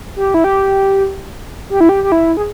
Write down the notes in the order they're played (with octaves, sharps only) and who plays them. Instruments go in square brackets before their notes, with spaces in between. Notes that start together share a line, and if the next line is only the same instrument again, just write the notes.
[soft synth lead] G4
E4
G4
G4
E4
G4
G4
E4
G#4